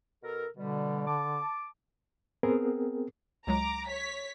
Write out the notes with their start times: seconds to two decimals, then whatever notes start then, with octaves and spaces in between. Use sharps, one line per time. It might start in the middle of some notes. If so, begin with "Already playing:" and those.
0.23 B2 A4 A#4
0.57 B2 D3 G3
1.07 A5 D6
2.43 B3 C4 G#4 A#4
3.47 C#2 F#3 G#3 A#5 D6
3.87 C#5 B6